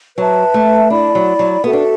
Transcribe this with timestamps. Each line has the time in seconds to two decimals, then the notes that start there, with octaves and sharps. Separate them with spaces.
0.17 F#3 B4 E5 A5
0.54 A3
0.90 D4 E4 D5 B5
1.15 F#3
1.39 F#3
1.63 B3 F#4 A4 E5
1.73 D4